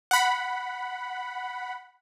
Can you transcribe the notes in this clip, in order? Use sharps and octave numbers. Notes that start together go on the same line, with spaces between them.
F#5 B5